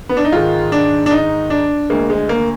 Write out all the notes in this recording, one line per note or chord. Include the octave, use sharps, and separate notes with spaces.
B3
D4
D#4
G#2 D#3 G#3 F4
D4
D4
D#4
D4
D2 D3 G#3 A#3
G#3
A#3